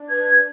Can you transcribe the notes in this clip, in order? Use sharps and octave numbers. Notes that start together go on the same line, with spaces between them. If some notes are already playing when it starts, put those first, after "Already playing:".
Already playing: D4
B4 G#6